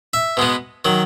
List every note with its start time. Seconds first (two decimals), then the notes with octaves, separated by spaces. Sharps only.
0.13 E5
0.37 B2 G#3 B3
0.85 D#3 F#3